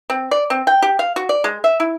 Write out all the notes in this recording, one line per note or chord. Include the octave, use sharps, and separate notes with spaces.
C4
D5
C4
G5
G4
F5
F#4
D5
G#3
E5
E4